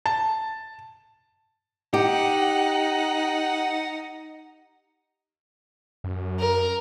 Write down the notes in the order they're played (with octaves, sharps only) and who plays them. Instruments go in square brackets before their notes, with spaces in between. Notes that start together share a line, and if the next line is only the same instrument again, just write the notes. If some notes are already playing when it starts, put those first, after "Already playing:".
[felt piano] A5
[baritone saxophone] D#4 [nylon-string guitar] G4 [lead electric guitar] F#5
[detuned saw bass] F#2
[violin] A#4